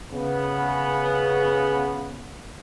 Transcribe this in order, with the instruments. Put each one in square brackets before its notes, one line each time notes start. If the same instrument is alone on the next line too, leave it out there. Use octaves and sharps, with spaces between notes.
[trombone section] C#3 B3